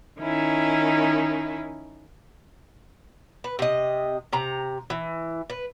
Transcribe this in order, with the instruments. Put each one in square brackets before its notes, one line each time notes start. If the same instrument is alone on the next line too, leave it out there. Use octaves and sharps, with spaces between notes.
[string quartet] D#3 C#4 D#4 E4
[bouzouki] B4
C3 D#5
C3 A#5
E3
B4